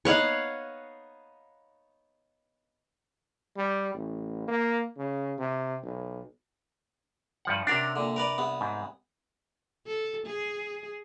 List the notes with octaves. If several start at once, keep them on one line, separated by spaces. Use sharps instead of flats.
B3 D#4 C#5 F5 F#5
G3
A1
A#3
C#3
C3
B1
G2 F3 F#5
C3 C#4 D4 F#4 A#4
A#2 D3
A#4 B4 D5
C2 B3
G#2
A4
G#4